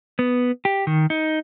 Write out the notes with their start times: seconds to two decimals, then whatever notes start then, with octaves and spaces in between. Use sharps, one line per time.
0.19 B3
0.65 G4
0.87 D#3
1.10 D#4